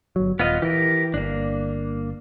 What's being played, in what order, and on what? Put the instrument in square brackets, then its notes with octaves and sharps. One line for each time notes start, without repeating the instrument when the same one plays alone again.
[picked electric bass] G1 F#3
[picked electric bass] D#1 [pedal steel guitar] B3 F4 D#5
[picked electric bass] E3 [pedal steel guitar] G4 A#4
[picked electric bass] G1 [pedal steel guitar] A#3 D4